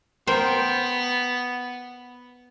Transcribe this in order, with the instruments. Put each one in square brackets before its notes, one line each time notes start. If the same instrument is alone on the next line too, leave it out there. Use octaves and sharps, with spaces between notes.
[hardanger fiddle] B3 [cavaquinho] A#4 G5 [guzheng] C5